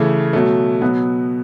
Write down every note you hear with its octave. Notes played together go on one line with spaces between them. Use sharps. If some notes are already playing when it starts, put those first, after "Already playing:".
Already playing: C#3 E3 A3
B2 F#3 A3
B2 F#3 B3